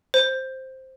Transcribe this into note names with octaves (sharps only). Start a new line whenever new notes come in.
C5